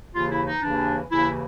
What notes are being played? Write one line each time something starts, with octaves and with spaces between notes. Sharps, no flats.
D#2 C#3 E3 F4
E4
D#4
D#2 C#3 E3 D4
D#2 C#3 E3 E4